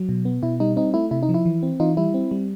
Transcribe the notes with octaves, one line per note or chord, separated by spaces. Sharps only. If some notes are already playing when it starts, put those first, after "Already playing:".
Already playing: F#3
B2
B3
B2 E4
G3 D#4
C4 D#4
A3 E4
C3 E4
D#4
F3
E4
E3
C4
E3 D#4 F4
G3 E4
C4
G3